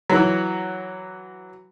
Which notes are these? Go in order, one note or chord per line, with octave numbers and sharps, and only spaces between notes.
E3 F#3